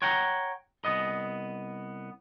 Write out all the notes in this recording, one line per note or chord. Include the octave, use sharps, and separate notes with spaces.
C#5 F#5 G5 A#5
C2 B3 D#5